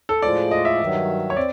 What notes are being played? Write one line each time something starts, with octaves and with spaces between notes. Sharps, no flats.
A4
A2 F3 G#3 D5
D#5
E5
G2 D#3 F#3
C#5
C4 D5